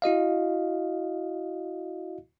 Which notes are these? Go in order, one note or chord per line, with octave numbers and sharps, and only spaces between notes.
E4 F#4 D#5 F5